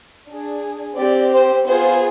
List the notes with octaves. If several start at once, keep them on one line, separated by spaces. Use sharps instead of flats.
D4 G#4
C4 G4 D5
C5
B3 F4 G#4 C5